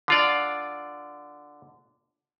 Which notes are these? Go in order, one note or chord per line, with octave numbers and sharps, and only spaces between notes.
D3 F4 D5